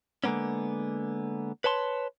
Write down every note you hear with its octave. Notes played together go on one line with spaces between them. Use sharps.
D3 G#3 A#3 B3 C#4
B4 C#5 A5 C6